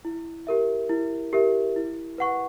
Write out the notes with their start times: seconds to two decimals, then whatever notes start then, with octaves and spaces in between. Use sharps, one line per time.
0.05 E4
0.47 G4 A#4 E5
0.89 E4
1.33 G4 A#4 E5
1.76 E4
2.18 B4 F#5 C#6